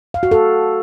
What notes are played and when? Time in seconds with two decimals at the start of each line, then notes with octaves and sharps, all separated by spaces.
0.14 F5
0.23 F#4
0.31 A4